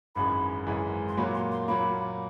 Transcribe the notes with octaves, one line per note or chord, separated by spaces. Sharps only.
G#1 F#2 C#3 E3 G#3 B5
G#1 F#2 C#3 E3 G#3
C6
A#2 F#3 A#3 B5
C6
C6
A#2 F#3 A#3 B5